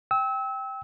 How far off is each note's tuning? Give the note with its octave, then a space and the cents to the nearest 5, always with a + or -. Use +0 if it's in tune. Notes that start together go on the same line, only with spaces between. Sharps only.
G5 +0 E6 -30